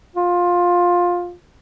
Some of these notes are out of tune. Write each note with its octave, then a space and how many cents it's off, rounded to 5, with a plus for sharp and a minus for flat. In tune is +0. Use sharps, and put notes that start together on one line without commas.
F4 +15